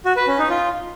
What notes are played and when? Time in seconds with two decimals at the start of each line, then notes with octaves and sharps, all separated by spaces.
0.05 F#4
0.16 B4
0.28 C#4
0.39 D#4
0.50 F4